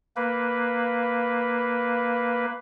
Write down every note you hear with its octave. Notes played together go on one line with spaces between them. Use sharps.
A#3 B4